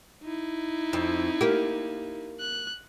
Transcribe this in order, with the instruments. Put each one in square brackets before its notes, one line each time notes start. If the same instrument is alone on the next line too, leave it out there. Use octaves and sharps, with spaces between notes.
[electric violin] D#4 E4
[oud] F2
A#3 G4
[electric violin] F#6